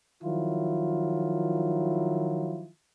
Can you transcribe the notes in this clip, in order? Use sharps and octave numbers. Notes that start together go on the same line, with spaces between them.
D#3 F3 F#3 E4 F4